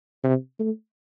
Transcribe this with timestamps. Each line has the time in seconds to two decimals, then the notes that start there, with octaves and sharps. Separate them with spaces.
0.24 C3
0.60 A3